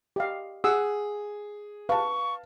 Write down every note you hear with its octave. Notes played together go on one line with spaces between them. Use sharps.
G4 D#5 F5
G#4 F#5 D#6 E6
B4 F5 A5 C#6